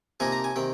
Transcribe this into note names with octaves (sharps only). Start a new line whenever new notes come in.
C3 F3 A#3 D#4 G#5
A#5
G#5
C3 D#3 G5